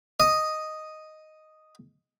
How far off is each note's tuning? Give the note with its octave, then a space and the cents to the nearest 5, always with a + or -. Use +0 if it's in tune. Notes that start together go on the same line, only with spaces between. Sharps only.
D#5 +0 D#6 +0